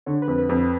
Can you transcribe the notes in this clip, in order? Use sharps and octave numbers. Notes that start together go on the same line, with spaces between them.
D3 C#5
B4
F2
B4
F2
B4